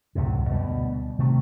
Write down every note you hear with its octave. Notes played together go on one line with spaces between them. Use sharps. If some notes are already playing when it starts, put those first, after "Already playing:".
C#2 F#2 A2 C3
D2 B2 G3
C3 D#3 A3